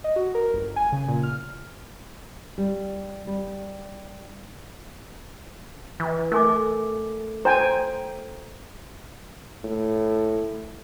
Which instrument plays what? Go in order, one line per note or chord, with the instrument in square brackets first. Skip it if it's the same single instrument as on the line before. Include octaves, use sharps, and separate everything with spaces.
[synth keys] D#5
F#4
A#4
G1
G#5
C#3
A#2
F6
[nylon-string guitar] G3
G3
[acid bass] E3
[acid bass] A3 [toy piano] A#4 G#5 D6
[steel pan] C5 G5 G#5 [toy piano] A#5
[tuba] A2